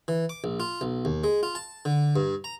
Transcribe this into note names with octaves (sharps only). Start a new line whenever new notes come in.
E3
D6
A#1
F4
B1
D#2
G#3
F4
A5
D3
G2
A#5